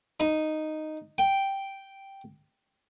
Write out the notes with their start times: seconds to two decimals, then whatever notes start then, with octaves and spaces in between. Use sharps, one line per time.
0.20 D#4
1.18 G5